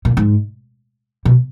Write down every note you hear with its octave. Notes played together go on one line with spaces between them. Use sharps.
A#2
G#2
B2